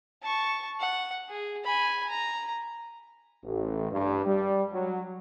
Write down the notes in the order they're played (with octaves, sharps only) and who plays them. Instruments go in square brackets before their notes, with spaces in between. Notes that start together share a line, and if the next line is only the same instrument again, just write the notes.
[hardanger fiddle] A5 C#6
F#5
G#4
G#5 B5
A#5
[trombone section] A1
G2
G3
F#3